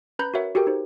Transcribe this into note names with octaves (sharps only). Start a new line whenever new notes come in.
C#4 B4 A#5 B5 G6
F#4 A#4 C#5 E5 F#5
F#4 G4 A4 A#4 G5
D#4 G4 C5